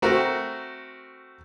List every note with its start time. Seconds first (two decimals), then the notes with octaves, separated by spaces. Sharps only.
0.02 A3 C4 F#4 A#4